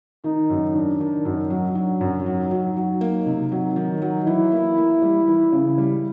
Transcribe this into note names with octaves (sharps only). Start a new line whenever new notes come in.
D#3 D#4
F#2
D#3 D4
D#3
F#2 D#4
F#3
F#3 D4
F#2
F#3 D#4
F#3
F#3
A#3
C3 D#4
F#3
D#3 D#4
F#3
E3 E4
A#3
A#3
G3
E3
C#3
G3